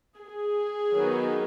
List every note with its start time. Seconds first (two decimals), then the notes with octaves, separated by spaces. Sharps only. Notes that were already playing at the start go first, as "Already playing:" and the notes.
0.17 G#4
0.93 D#3 F#3 B3 D#4